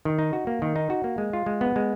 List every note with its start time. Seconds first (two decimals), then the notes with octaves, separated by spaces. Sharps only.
0.05 D#3
0.19 D#4
0.33 F#4
0.47 A#3
0.62 D#3
0.76 D#4
0.90 F#4
1.04 A#3
1.18 G#3
1.33 F4
1.46 G#3
1.61 B3
1.76 G#3